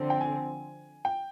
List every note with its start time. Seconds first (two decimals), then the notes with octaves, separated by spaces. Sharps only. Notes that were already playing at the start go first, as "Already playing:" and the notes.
Already playing: D3 F3 C4
0.10 G5
0.21 G#5
1.05 G5